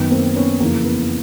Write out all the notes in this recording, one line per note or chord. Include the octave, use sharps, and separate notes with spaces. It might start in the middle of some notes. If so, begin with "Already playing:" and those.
Already playing: F#2 D#3 B3
A#3 C4
B3 C#4
F2 C#3 E3 A#3
B3